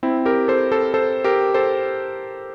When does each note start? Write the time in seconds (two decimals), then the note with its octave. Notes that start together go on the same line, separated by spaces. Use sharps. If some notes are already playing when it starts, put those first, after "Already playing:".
0.03 C4 E4
0.26 G4 A#4
0.48 A4 C5
0.72 A4 C5
0.94 A4 C5
1.24 G4 A#4
1.54 A4 C5